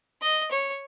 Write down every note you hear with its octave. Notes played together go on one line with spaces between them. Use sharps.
D#5
C#5